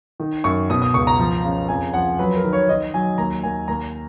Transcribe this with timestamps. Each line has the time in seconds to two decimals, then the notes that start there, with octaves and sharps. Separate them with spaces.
0.20 D#3
0.44 F#2 C#6
0.70 B2 D#6
0.82 D#6
0.94 C#2 C#6
1.07 A#5
1.19 F3
1.44 C#3
1.69 F2 G#5
1.94 F3 F#5
2.19 F#3 B4
2.36 A#4
2.44 D#3
2.53 C#5
2.69 D#3 D#5
2.94 F#3 G#5
3.18 D#2 A#5
3.43 D#2 G#5
3.68 D#2 A#5